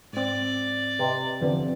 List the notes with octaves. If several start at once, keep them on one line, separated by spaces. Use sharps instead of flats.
G#2 C4 D5
C3 B4 D#5
E2 D3 F3 C4 B4 D5